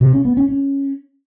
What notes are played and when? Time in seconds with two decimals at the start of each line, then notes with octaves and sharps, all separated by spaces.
0.01 C3
0.13 C#4
0.25 B3
0.37 C#4
0.49 C#4